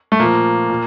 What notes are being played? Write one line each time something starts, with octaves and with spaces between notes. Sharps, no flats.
A3
A#2 F3 A#3
A#2